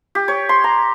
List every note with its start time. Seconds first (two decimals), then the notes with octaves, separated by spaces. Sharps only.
0.15 G4
0.28 C#5
0.49 C6
0.64 A#5